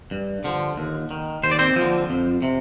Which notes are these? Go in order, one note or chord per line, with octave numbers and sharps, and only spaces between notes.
G2
D3 F3
D#2
D#3
D#2 C5
D5
C4 C5
F3
D3
F2
C3